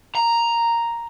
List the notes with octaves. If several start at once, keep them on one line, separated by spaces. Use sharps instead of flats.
A#5